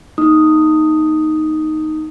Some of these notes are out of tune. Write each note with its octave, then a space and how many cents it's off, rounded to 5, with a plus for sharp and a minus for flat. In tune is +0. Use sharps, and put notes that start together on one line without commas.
A#3 +0 D#4 +0 D#6 +0